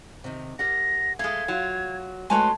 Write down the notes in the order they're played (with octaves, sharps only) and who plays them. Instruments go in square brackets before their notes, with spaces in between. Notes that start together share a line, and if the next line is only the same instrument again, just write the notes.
[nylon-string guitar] C3 D#3
[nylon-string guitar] G4 A#4 F#5 [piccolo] A#6
[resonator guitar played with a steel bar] G#3 A3 [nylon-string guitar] F5 [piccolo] G#6
[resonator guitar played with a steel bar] F#3 F4
[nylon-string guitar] G#3 A3 F#4 [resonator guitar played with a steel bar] B4 C#5 G#5 [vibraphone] A5 [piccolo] C6